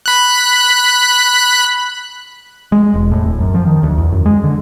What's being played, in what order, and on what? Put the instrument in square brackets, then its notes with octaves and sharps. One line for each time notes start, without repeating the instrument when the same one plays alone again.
[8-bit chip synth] B5 F#6
[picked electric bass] G#3
E1
A2
D1
F#2
F3
D#3
D2
E2
F#2
G#3
D3